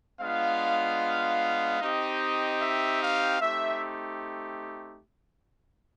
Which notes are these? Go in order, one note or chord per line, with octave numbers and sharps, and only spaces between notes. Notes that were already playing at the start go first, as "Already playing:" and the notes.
G#3 B3 D4 F4 F5
C4 D#4 G4 D#5
E5
F5
A3 C4 D#4 G4 E5